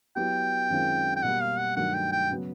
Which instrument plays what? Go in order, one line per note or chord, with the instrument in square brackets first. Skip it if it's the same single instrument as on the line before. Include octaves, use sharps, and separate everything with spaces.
[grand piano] F#3 B3 E4 G4 [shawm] G5
[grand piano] F#2 D#3 G#3 C4 F4
[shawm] G5
[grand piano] B2 G3 A#3 [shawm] F#5
[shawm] F5
F#5
[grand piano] G2 D#3 F#3 A3 [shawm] F#5
[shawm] G5
G5
[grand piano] C#3 F#3 B3